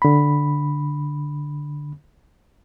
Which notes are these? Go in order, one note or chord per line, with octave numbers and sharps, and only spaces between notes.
D3 B5